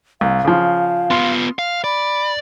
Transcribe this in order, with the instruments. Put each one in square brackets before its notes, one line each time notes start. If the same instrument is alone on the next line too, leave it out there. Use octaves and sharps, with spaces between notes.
[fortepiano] C2 [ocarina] F5
[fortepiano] C#3 F3
[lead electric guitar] B3 F4 [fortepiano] C6
[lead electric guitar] F5
[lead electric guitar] D5 [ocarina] B5